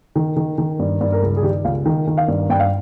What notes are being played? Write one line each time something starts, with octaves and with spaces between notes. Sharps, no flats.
D#3
D#3
D#3
G2
G2
A#4
C#2 G#4
G#4
D#3 G4
C#2 F5
D#3
D#3
F5
G2
G2 G5
F5